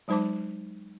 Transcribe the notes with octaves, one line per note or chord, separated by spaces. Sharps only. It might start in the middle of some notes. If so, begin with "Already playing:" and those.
F#3 G#3 D#4 C5 A5 D6